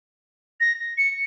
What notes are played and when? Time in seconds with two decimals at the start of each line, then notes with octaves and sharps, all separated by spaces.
0.60 A#6
0.98 C#7